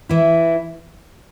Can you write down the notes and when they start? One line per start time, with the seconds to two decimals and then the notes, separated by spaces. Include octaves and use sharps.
0.09 E3 E4